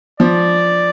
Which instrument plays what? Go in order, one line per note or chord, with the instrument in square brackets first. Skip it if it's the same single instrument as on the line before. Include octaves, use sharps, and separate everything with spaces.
[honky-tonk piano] F3 [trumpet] D5